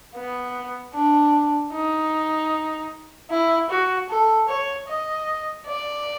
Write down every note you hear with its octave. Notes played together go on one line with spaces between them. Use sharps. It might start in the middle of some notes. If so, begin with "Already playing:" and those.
B3
D4
D#4
E4
F#4
A4
C#5
D#5
D5